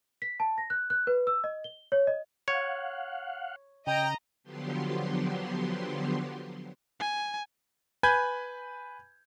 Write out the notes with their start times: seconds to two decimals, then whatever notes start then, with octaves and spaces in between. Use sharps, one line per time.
0.22 B6
0.40 A5
0.58 A#6
0.70 F#6
0.90 F#6
1.07 B4
1.27 E6
1.44 D#5
1.64 G7
1.92 C#5
2.07 D#5
2.48 C#5 F5 F#5
3.87 C#3 D#5 G5 A#5
4.43 D3 F3 F#3 B3 G4 C6
7.00 G#5
8.03 B4 G#5 B5 G6 G#6